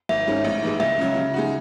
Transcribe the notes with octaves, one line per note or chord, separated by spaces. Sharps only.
G#1 E5
G#2 D#3 G#3 C#4
A1
G#2 E3 G#3
C#2 E5
C#3 F#3
C#3
G#3 D#4 F#4